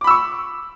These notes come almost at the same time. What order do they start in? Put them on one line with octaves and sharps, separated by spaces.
D6 B5 E6 C#6